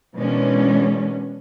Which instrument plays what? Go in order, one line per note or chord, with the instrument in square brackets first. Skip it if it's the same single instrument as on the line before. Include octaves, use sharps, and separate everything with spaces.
[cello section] B2 D#3 E3 G#3 C#4 D4